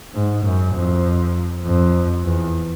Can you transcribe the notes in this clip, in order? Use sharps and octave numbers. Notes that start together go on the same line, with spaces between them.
G#2
F#2
F2
F2
E2